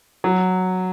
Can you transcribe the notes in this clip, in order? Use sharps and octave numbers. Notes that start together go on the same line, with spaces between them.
F#3